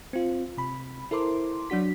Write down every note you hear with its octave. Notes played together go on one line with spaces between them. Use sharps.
C4 F4
C3 B5
E4 A4 A#4 C5 C6 D6
F#3 D4 F#4 B6